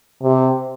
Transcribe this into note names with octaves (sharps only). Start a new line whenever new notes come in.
C3